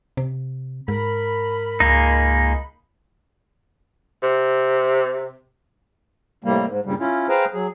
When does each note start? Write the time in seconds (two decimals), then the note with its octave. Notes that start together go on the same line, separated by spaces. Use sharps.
0.17 C3
0.88 G#2 A#4 B5
1.80 C#2 G#3 A#3 D#4
4.23 C3
6.44 A2 C3 G3 A#3
6.67 G#2
6.85 G2 A#2 C#3 G3
6.99 C#4 E4 F4
7.29 G#4 B4 C5 F5 G5 A#5
7.53 F#3 G#4